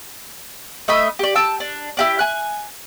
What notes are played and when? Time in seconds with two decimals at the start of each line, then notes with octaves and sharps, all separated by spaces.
0.88 A3 D#5 E5 B5
1.19 G4 D5
1.35 G5 A5 E6
1.60 D4
1.97 E4 G4 D5
2.19 G#5 F#6